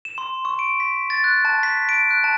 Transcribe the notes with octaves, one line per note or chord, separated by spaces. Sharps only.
E7
C6
C#6
D7
B6
A6
F#6
A5
B6
D7
F#6
A5